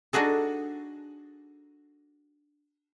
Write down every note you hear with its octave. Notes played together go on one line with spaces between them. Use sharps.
D4 D#4 F#4 G#4 A4